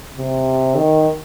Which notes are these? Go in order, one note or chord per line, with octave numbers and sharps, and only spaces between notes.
C3
D#3